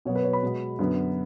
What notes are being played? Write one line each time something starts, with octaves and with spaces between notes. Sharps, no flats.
B2 F#3 B3 C#5
B4
C#5
B5
B2 G#3 B3
F#2 D3 F#3 B3